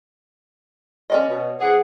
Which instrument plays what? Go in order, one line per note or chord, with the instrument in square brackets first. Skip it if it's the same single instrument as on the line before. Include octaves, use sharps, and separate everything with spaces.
[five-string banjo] C#4 D5 D#5
[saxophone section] B2
[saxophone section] E3 C4 G#4 [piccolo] F#5